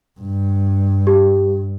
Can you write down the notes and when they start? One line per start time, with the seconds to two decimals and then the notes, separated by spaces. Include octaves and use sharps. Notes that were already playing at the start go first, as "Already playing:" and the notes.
0.20 G2
1.07 G4